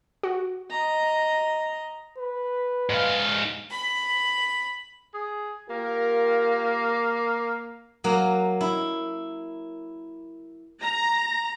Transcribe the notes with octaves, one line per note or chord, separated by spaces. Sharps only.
F#4
D#5 A#5
B4
G#2 F5
B5
G#4
A#3 F4 G4 A#4
F#3 A#3
E4
A#5